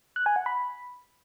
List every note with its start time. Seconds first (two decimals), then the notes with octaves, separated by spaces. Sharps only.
0.16 F#6
0.26 G#5
0.36 F#5
0.46 B5